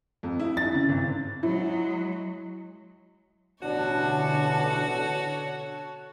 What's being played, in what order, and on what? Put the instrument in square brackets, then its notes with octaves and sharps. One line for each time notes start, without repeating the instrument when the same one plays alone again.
[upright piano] F2
E4
A6
C#3
G#1
[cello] F#3 G#3 [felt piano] E4
[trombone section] A1 B3 D4 [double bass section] B2 D3 [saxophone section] F#4 [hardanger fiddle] A4 C#5